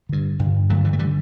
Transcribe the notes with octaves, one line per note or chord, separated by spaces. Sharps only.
G2 D3
G2 D3
G2 D3 F#3 A3
E3 G3
A3
D3 E3 G3